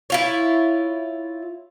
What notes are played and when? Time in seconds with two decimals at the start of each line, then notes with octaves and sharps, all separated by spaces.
0.10 E4 F4 C#5